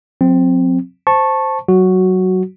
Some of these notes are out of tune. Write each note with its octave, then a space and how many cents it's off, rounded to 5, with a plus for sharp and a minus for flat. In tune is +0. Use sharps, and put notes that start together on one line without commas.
F#3 -45 C4 +0
C5 +0 A5 +0 C#6 -15
F#3 +15 F#4 +0